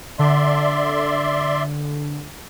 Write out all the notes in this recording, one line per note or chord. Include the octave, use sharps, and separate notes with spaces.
D3 D5 E5 C6